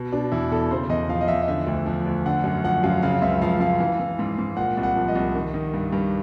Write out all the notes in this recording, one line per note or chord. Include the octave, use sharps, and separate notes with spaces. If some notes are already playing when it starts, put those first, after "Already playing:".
Already playing: B2
B2 D4
E2 E4
E2 A4
C#3 C5
E2 D#5
F3 F5
D#5
E2 E5
D#5
D3 E5
D2
F3
D2
D3 F#5
F#2
F3 F#5
F#2 F5
C#3 F5
C#2 E5
F3 F5
C#2 F5
E3
E3
G#2
G#2
A#2 F#5
C2
F#5
F3
D#5
C2
D#3
D#3
G2
G2